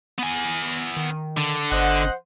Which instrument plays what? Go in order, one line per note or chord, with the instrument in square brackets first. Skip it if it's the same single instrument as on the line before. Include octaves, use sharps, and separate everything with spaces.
[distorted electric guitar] B3 G#5
[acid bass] D#3
[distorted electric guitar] D3
[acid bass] G1 [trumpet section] C5 D#5 F#5